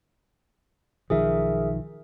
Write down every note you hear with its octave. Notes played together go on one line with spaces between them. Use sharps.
B1 D#3 F3 G#4 A#4 E5